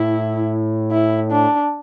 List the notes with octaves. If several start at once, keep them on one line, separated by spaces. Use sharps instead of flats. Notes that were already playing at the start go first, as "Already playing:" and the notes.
Already playing: A2 E4
E4
D4